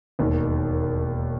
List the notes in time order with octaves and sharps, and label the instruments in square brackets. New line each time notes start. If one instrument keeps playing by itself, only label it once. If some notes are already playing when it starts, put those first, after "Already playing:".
[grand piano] E1 D#2 D#3